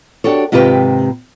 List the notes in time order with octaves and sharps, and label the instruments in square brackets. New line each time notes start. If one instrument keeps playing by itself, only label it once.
[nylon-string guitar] D4 F#4 G4 A4 C#5
G#2 C3 D#3 F4 G4 B4